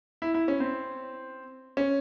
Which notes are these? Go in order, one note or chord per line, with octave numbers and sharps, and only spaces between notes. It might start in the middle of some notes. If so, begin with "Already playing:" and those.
E4
E4
C#4
C4
C#4